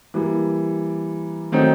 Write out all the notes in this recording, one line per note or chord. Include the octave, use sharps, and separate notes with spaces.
E3 G3 A#3
D#3 F#3 A3 C4 D#4